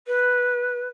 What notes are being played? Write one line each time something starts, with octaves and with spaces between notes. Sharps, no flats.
B4